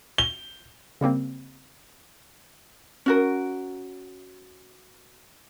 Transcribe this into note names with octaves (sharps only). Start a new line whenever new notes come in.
G7
C#3 G3 A#3 C4
C#4 F#4 A#4